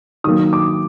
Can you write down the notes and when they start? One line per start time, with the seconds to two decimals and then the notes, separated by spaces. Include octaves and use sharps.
0.24 D#3 F#3 A#3 D#6
0.53 D6